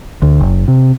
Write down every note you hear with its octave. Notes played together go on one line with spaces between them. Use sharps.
D2
F#1
C3